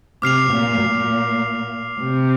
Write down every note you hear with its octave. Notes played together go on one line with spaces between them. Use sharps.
C3 D6 F6 C7 F7
A#2
A#2
C3